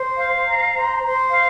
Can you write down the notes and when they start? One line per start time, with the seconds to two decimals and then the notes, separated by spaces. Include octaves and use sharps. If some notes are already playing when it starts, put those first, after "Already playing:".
Already playing: C5
0.19 F5
0.47 A#5
0.75 C5
1.03 C5
1.31 F5